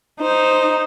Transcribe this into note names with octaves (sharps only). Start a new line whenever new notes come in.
D#4 C5